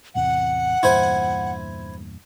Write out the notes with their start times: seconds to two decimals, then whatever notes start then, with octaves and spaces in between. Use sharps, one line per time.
0.15 A1 E2 C3 F#5
0.83 E2 G2 A#2 E4 C5 G#5